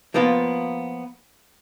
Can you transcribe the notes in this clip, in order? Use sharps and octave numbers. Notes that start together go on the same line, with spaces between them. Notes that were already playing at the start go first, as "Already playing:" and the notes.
F3 A#3 B3 F4